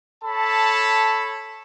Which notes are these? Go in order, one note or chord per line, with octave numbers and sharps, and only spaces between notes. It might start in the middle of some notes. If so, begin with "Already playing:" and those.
A4 C#5 A5 B5